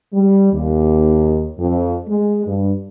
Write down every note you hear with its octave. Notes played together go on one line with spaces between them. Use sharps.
G3
D#2
F2
G#3
G2